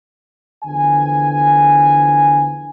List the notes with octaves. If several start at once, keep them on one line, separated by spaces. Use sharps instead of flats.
E2 D3 F3 G#5